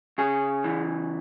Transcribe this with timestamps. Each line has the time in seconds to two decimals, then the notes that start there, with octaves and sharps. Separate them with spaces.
0.18 C#3 G#4
0.64 E3